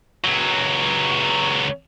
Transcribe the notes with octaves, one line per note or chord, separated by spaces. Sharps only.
C#2 F#3